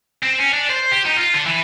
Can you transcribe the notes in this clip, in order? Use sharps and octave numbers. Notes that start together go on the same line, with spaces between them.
C4
C#4
D4
C5
G4
D#4
F4
D3
E3